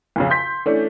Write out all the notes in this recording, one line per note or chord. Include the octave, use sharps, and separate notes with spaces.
B1 F2 C#3
C6 G6 B6
E3 A3 C#4 D4